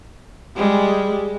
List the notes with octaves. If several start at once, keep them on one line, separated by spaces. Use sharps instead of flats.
G3 G#3